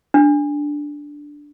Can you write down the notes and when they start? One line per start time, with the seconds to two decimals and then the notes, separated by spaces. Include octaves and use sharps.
0.14 D4